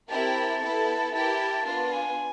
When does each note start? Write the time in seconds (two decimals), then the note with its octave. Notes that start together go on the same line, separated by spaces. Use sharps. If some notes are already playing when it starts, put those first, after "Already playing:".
0.10 C4 E4 G4 A#4 A5
0.62 B3 E4 A4
1.14 E4 G4 A#4 A5
1.66 B3 D4 F4 A5
1.92 G#5